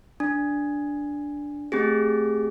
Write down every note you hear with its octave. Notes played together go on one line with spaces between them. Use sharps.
D4
A3 C4 G4 G#4